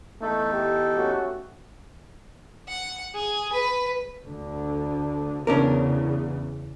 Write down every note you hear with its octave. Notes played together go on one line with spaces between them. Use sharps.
E2 A3 D#4 A4
G4
A3 C#4 F#4
F#5
G#4
B4
D2 D3
E2 C#3 C#4 D4 A#4